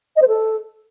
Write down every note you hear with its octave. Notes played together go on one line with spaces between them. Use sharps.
D#5
C5
A4